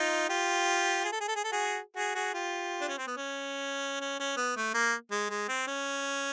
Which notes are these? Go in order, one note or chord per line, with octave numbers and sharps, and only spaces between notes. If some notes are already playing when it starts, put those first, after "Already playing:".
Already playing: D#4 F4
F4 G4
G#4
A4
G#4
A4
G#4
A4
F#4 G#4
F#4 G#4
F#4 G#4
F4 G4
D4
C#4
C4
B3
C#4
C#4
C#4
B3
A3
A#3
G#3
G#3
C4
C#4